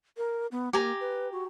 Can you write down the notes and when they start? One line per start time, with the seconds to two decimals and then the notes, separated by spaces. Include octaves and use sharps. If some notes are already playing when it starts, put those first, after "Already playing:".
0.17 A#4
0.52 B3
0.73 A#3 G4 G#5 A#5
1.00 B4
1.32 F#4